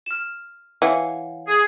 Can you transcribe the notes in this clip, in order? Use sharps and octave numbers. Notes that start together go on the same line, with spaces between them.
F6 E7
E3 C#5 F5 F#5
G#4